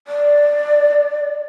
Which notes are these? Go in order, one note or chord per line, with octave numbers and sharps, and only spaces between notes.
D5